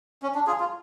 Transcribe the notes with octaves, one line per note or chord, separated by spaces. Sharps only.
C#4
D4
F4 G#4
F4